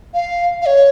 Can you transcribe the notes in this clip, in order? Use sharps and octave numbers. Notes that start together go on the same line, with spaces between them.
F5
F5
C#5